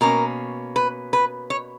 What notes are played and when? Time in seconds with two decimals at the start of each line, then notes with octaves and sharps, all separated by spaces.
0.01 B2 A#3 C#4 A#4
0.76 B4
1.13 B4
1.50 C#5